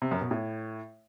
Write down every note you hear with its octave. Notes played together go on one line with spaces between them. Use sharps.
C3
F#2
B2
A2